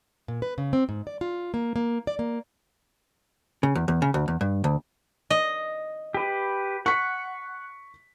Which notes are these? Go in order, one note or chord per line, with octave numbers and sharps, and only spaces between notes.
A#2
B4
C#3
C4
G#2
D5
F4
A#3
A#3
D5
A#3
C#3
E2
E2
C#3
D2
E2
G2
D2
D#5
G4 B4
F#5 C#6 B6